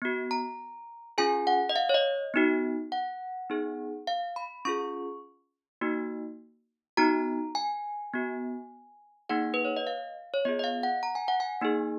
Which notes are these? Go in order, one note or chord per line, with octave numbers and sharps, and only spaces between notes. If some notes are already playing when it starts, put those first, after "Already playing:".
B3 F#4
A#5
C#4 F4 G#4 G#5
F#5
D#5
F5
C#5
D#5
B3 D#4 F#4
F#5
B3 D#4 G#4
F5
B5
C#4 F4 G#4 C#6
A#3 D#4 F#4
B3 D#4 F#4 A#5
G#5
B3 F#4
A#3 D#4 G#4 F#5
B4
C#5
D#5
F5
C#5
B3 F4 G#4 D#5
D#5
F5
F#5
A#5
G#5
F#5
G#5
A#3 D#4 G#4